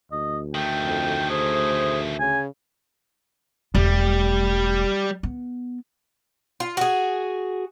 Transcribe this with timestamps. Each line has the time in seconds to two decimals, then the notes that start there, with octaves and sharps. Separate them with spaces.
0.12 D2 D#5
0.55 D#3 A3 G5
0.85 F2
1.29 G#4 C5
2.20 C#3 G#5
3.75 E1 G3 A3
5.23 B3
6.60 F4
6.77 F#4 G#4